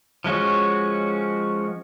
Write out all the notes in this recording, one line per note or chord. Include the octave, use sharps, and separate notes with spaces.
F3 G#3 C#4 F#4